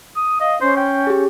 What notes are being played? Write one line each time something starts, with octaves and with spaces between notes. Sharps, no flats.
D#6
D#5 F5
C#4 C5
G5
G4 G#4